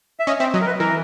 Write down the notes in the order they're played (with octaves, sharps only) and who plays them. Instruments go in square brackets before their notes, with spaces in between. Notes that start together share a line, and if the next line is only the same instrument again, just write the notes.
[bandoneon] E5
[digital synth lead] C#4 [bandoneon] D#5
[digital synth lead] C4 [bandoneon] E5
[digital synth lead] F#3 [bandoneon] D#5
[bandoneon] A#4
B4
[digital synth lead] E3 [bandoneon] A#4